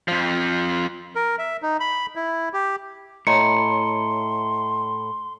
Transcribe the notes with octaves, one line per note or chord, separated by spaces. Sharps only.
F2 F3
A#4
E5
D#4
B5
E4
G4
A2 C#5 D#5 A#5 C6 C#7